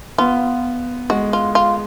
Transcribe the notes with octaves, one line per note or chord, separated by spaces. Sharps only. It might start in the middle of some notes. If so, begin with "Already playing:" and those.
B3 F4
G#3 F#4
F4
F4